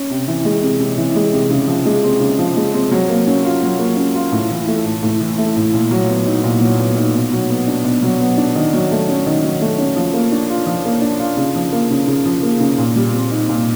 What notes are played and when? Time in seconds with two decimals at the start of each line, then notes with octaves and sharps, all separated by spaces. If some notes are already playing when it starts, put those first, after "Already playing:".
Already playing: C#4
0.10 C3
0.28 E3
0.45 G#3
0.62 C3
0.80 C3
0.98 E3
1.15 G#3
1.33 C3
1.50 C#3
1.68 F3
1.85 G#3
2.04 C4
2.20 C#3
2.39 F3
2.56 G#3
2.74 C4
2.91 F#3
3.09 A#3
3.27 C#4
3.44 F4
3.62 F#3
3.79 A#3
3.97 C#4
4.15 F4
4.32 A2
4.50 E3
4.68 A3
4.86 A2
5.03 A2
5.21 E3
5.38 A3
5.56 A2
5.74 A#2
5.91 F#3
6.09 B3
6.26 D#4
6.44 A#2
6.61 F#3
6.79 B3
6.97 D#4
7.15 B2
7.32 F#3
7.50 B3
7.67 D4
7.84 B2
8.03 F#3
8.20 B3
8.37 D4
8.55 D#3
8.73 F#3
8.91 A3
9.09 C#4
9.26 D#3
9.44 F#3
9.61 A3
9.78 C#4
9.96 F3
10.13 A#3
10.32 D4
10.50 F4
10.66 F3
10.85 A#3
11.01 D4
11.20 F4
11.37 C#3
11.56 F3
11.72 A#3
11.91 C#3
12.07 C#3
12.25 F3
12.42 A#3
12.60 C#3
12.78 A#2
12.96 G3
13.13 C4
13.31 D#4
13.49 A#2